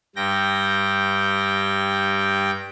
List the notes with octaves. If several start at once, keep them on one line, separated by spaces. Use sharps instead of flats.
G2 G5 A#6